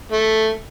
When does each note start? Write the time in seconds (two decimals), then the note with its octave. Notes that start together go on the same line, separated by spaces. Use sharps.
0.12 A3